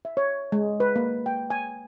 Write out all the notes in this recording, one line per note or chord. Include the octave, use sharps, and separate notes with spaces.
E5
C#5
G#3
B4
A#3
G5
G#5